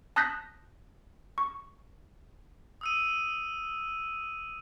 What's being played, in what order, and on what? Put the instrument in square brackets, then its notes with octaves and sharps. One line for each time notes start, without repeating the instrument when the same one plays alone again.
[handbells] A5 D#6 F#6 G6 A#6 B6
C#6
[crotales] D#6 E6 D#7